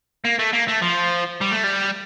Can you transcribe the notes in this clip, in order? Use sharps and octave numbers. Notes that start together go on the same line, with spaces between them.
A#3
A3
A#3
A3
F3
G3
A3
G3